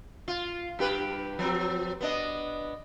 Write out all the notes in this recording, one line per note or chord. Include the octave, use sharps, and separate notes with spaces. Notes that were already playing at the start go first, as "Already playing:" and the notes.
F4
G2 G4 B4
F3 F#3 C4
B3 D4 D#5